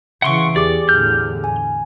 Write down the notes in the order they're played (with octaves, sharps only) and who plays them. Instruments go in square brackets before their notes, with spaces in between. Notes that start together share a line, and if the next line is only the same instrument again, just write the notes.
[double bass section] C#3 E3 [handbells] E5 D7 [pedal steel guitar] F#5 C6 C#6
[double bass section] E2 [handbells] G4 G#4 D6 [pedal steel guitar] D5
[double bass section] E2 A2 D3 [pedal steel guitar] F6 G6
[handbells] G#5